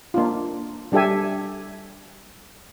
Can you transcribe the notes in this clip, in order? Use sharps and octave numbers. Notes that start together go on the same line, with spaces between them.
A#3 D4 F4
G3 D4 G4 A4 E5 G#5